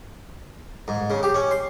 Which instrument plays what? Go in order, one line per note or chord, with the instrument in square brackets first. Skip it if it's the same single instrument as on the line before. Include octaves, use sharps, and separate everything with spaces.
[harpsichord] G#2
C#3
G4
C#4
C6